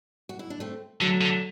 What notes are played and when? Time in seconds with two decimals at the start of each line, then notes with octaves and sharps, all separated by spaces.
0.29 F#4
0.39 E4
0.50 D4
0.60 A3 C4
1.01 D3 F#3 A3
1.21 D3